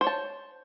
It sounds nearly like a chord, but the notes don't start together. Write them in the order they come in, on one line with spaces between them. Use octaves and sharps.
C5 C#5 A5